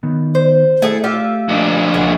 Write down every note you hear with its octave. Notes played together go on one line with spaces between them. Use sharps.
D#3 B3
C5
A3 E4 G#4 A4
F4 G4 E5
F2 D4
C#2 G#4 F#5